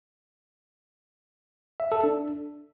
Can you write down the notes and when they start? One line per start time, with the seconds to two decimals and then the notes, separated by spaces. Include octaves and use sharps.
1.80 E5
1.92 A4
2.04 D4